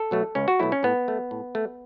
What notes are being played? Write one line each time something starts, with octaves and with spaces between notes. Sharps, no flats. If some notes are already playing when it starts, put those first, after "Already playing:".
Already playing: A4
B2 F#3 A3
C#2 C#4
F#4
B2 F#3 A3 E4
C#4
A2 B3
A3
A2
A3